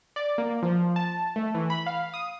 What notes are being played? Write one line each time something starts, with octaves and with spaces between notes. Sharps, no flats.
D5
A#3
F3
A5
A3
E3
B5
F5
D#6